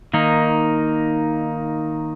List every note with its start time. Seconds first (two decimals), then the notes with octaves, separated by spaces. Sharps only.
0.13 D#3 A#3 D#4